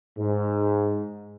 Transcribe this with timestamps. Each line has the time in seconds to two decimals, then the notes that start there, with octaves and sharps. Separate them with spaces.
0.18 G#2